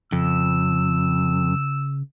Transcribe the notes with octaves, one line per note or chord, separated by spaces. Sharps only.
F2 C#3 E6